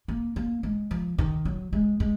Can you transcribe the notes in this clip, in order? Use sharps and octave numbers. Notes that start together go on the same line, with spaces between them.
A#3
A#3
G#3
F3
D#3
F#3
G#3
G#3